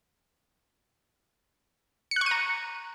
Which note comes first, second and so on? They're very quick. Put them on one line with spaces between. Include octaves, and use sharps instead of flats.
C#7 F#6 C#6 D#7 A#5